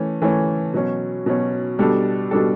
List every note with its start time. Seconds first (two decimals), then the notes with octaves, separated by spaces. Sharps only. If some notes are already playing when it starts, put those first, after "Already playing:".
Already playing: E3 A3 C#4
0.22 E3 A3 C#4
0.74 B2 F#3 C#4
1.26 B2 F#3 C#4
1.79 B2 G3 D4 A4
2.31 B2 G3 D4 A4